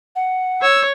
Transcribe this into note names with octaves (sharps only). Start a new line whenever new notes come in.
F#5
C#5 E6